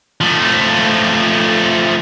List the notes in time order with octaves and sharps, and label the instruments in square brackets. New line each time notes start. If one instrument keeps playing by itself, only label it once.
[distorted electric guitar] F3 A3